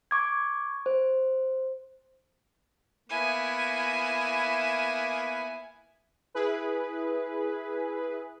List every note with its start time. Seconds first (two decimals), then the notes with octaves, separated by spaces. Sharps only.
0.11 C#6 D6 G#6
0.86 C5
3.09 A#3 B3 E4 G#5
6.35 E4 G#4 B4